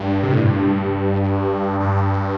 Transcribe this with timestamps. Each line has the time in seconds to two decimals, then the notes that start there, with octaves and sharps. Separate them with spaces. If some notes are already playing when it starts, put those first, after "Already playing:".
Already playing: G2
0.23 C3
0.33 A2
0.42 G2
1.80 G2